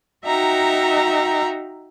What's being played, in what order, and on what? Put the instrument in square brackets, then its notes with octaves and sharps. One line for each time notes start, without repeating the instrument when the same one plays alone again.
[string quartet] D#4 F#4 E5 G5 A#5